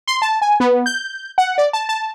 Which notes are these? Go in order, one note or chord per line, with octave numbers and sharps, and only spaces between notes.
C6
A5
G#5
B3
G6
F#5
D5
A5
A5